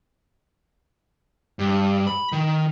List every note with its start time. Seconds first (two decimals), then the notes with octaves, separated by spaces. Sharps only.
1.59 G2
2.07 B5
2.32 D#3